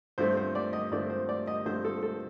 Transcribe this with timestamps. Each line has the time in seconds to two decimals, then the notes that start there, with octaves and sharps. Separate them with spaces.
0.18 G2 F3 A3 C4 C5
0.37 C5
0.55 D5
0.73 D#5
0.92 G2 F3 A3 C4 D5
1.10 C5
1.29 D5
1.47 D#5
1.65 G2 F3 A3 C4 C5
1.85 A4
2.03 A4